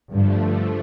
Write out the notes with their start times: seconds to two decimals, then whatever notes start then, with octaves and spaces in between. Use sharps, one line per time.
0.10 G2 D3 F3 A3